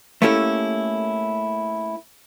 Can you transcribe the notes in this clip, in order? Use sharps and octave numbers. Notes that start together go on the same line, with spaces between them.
A3 A#3 C#4 E4 G4 A4